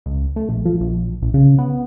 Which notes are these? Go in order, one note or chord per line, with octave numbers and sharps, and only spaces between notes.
C#2
A3
A#1
F3
A#1
A#1
C#3
B3